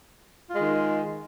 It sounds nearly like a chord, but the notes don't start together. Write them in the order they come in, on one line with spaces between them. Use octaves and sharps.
F4 G#3 D#3